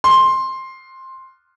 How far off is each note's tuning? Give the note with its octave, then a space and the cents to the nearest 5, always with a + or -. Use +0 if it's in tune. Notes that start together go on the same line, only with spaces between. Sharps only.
C6 +10